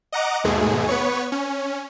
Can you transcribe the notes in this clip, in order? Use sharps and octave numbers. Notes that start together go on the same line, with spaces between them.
D#5 F#5 A#5 D6
D#2 G#2 B2 G#3 A3 G#4
B3 B4 C#5 C#6
C#4